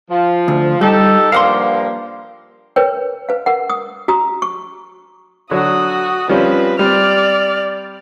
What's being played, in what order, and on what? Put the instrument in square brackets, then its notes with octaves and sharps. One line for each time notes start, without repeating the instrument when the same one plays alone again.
[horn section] F3
[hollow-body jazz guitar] D2
[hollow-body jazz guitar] G3 [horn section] D#4 G4 A4
[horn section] G2 F3 A#3 [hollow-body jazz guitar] F5 F#5 C6
[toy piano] A#4 B4 C#5 G5
B4 F5
A#4 F#5
D#6
F#4 A#5 D#6
C#6
[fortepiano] D3 F#3 [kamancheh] F#4 D#6
[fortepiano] F3 G3 C#4 [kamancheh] C4 B4
[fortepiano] G3 C4 [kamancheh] D5 F6